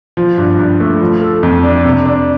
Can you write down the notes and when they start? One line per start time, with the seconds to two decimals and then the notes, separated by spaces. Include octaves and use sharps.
0.17 F3
0.38 G2
0.59 G2
0.80 A3
1.01 F3
1.22 A4
1.43 F2
1.64 D4
1.84 C3
2.05 D4